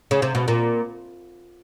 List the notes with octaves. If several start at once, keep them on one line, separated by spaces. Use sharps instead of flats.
C#3
C3
B2
A#2